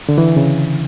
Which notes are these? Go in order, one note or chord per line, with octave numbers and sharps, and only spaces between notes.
D3
E3
C#3